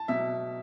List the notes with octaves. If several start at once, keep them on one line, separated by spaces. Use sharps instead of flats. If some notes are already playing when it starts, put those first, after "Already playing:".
Already playing: A5
B2 F#3 E5